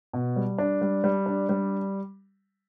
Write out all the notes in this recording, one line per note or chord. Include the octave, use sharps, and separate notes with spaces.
B2
G3
D4
G3
G3
D4
G3